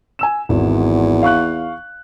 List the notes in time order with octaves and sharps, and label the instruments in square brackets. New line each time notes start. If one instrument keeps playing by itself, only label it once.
[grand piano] G#5 E6 E7
[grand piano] G#1 [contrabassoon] E2
[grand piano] F5 C#6 F#6